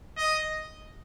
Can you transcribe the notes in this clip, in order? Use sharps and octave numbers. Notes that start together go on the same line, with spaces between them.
D#5